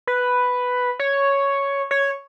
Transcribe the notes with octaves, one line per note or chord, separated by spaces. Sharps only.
B4
C#5
C#5